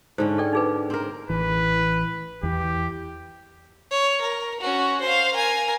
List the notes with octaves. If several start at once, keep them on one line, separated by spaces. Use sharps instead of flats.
G#2 D3 C#4 A4 C5
A4 D5 G5
D#4 G#4 B4
C4 A#4
A1 E3 B4
E2 E3 G4
C#5
A#4
C#4 F#4
C5 F5
A#4 G#5